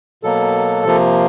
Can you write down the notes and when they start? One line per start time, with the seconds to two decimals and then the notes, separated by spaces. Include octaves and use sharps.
0.23 B2 F#3 A#3 A4
0.85 C3 F3 A#3